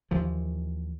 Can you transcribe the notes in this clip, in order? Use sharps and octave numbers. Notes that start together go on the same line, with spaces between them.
D#2 E3 F3